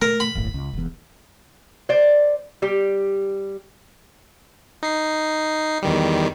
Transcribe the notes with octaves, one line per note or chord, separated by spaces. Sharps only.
A3 A#4
B5
D1 G1 A2
C#2
E1 E2
C5 D5
G3 G4
D#4 C7
E2 D#3 G3